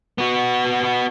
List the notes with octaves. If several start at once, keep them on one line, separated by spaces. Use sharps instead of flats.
B3 F#4